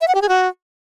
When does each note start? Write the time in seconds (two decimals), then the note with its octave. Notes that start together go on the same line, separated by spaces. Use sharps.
0.01 E5
0.08 F#5
0.15 G4
0.22 G#4
0.29 F#4